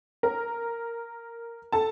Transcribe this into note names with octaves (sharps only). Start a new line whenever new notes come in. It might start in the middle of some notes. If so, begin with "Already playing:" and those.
A#4 A#5
A4 A5